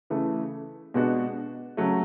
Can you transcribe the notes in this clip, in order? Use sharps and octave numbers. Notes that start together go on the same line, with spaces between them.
C#3 E3 A3
B2 G#3 B3 D4 F#4
C#3 F#3 A3